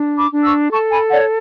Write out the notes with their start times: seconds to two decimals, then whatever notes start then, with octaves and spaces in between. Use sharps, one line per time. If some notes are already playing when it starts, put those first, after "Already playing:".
Already playing: D4
0.17 B5 D6
0.31 D4
0.44 C#6 E6
0.71 A4 A5 C#6
0.91 G#5 B5
1.10 C#5 D5 F#5